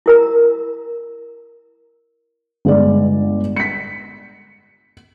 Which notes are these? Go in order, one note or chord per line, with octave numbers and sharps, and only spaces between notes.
E4 A#4 A#5
G1 G#3 D5
B6 C#7